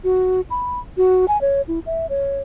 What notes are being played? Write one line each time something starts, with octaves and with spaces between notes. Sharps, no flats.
F#4
B5
F#4
G#5
C#5
E4
E5
C#5